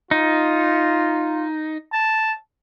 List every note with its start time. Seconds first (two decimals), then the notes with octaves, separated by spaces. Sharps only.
0.11 D#4 F4
1.92 A5